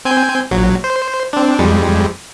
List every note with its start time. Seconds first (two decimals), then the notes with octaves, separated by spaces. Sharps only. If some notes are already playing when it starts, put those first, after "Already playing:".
0.05 C4 G#5 G6
0.51 A#1 F#3
0.84 C5
1.33 C4 D4
1.59 F2 G3 G#3